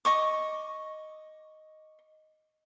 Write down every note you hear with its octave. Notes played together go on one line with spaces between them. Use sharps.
D#5 C#6 D6